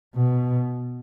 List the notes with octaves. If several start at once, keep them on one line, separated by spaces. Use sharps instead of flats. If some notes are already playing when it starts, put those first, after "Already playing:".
B2